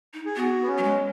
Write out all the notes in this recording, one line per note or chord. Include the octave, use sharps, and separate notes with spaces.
D#4
G#4
B3 F#4
B3
C#4
F#3
G#3